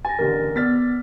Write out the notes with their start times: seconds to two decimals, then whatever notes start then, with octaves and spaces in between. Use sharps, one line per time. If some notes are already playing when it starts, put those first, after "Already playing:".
0.05 G#5 A6 A#6
0.19 A1 D#2 D3 A#4
0.56 B3 D5 F6 A6 B6